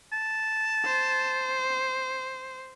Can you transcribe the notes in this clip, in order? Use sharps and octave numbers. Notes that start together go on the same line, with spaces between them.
A5
C5